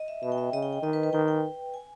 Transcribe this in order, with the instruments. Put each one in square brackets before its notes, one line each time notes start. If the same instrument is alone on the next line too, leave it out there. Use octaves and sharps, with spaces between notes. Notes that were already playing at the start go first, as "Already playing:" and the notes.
Already playing: [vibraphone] D#5
E5
[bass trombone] B2 [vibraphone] E5
[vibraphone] G5
E5
[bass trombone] C#3 [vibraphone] D#5
[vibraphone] G5
G5
[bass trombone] D#3 [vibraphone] D#5
[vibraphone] B4
B4
[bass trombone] D#3 [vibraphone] G5
[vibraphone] G5
G#5